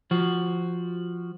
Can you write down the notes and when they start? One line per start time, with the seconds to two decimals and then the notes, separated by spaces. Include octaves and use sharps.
0.11 F3 F#4